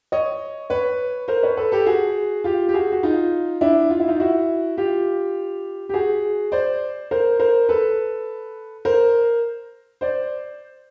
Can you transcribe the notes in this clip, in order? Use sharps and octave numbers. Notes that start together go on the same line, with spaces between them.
C#5 D#5
B4 C#5
A#4 C5
B4 C#5
A4 B4
G4 A4
F#4 G#4
F4 G4
G4
F#4 G#4
F#4
D#4 F4
D4 E4
F4
E4
D#4 F4
E4 F#4
F4 G4
G4
F#4 G#4
C5 D5
A#4 C5
A#4 C5
A4 B4
A#4 C5
C5 D5